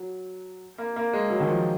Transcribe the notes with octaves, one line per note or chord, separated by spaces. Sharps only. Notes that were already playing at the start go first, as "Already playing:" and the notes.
Already playing: F#3
A#3
A#3
G#3
F#3
D#3
F3